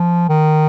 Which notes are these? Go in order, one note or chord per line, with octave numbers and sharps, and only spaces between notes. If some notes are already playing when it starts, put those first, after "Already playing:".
Already playing: F3
D#3